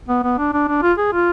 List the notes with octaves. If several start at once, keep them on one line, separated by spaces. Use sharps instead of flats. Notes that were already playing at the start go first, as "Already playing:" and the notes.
B3
B3
D4
D4
D4
F4
G#4
F4